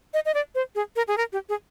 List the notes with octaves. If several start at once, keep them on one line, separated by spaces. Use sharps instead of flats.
D#5
D#5
D5
C5
G#4
A#4
G#4
A#4
G4
G#4